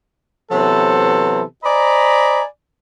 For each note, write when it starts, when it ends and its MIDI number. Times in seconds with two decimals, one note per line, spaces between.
0.52 1.43 48
0.52 1.43 52
0.52 1.43 54
0.52 1.43 59
0.52 1.43 69
0.52 1.43 72
1.64 2.43 72
1.64 2.43 74
1.64 2.43 75
1.64 2.43 80
1.64 2.43 82
1.64 2.43 83